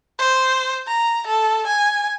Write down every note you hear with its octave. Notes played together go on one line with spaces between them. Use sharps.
C5
A#5
A4
G#5